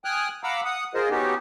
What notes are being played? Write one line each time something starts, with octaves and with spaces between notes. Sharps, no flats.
G5 G#5 D#6 F6 F#6
F5 F#5 A#5 B5 D6 E6
F#5 D#6
F4 G#4 A#4 C5 D#5
B3 C#4 D#4 F#4 G4